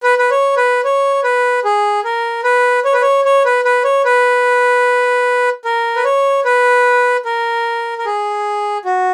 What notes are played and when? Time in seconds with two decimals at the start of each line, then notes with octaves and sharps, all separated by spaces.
0.03 B4
0.19 B4
0.31 C#5
0.57 B4
0.85 C#5
1.24 B4
1.64 G#4
2.04 A#4
2.44 B4
2.85 C#5
2.93 B4
3.02 C#5
3.25 C#5
3.45 B4
3.65 B4
3.84 C#5
4.05 B4
5.65 A#4
5.96 B4
6.04 C#5
6.45 B4
7.25 A#4
7.98 A#4
8.06 G#4
8.85 F#4